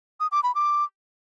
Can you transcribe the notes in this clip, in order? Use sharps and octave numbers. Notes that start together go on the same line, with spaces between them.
D#6
D6
B5
D6